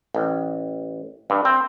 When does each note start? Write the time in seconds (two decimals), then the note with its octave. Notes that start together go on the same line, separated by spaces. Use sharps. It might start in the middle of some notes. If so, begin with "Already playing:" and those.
0.15 A1
1.30 G2
1.45 C4